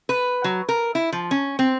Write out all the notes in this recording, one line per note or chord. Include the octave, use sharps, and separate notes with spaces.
B4
F#3
A#4
E4
F3
C#4
C4